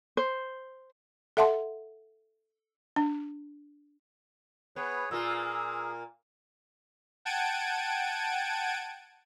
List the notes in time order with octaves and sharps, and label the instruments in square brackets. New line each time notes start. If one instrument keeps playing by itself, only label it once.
[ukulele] C5
[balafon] A4 E5 F#5 A5 C6
D4
[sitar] B3 [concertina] G#4 B4 C#5
[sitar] A#2 A#3 F4 [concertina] G#4 [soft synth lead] E6
[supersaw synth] F#5 G5 A5 G#6 D7 D#7